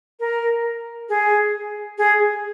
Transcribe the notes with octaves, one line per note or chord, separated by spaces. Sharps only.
A#4
G#4
G#4